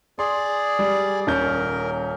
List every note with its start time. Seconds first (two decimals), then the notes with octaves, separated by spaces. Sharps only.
0.19 G#4 D5 C6
0.79 G3
1.27 D#1 C#4 A#4 G6